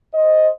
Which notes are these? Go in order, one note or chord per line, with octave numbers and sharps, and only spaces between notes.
C5 D#5